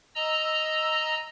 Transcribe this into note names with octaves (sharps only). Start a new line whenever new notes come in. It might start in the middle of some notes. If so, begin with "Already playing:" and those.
D#5 A#5 E6